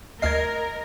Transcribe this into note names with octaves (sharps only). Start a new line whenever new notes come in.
D2 A#4 D#5 F6 G#6 C7